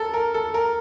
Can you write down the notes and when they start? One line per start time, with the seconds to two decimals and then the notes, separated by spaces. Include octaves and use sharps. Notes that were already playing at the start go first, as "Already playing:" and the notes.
Already playing: A4 A#4
0.14 A#4
0.34 A4
0.54 A#4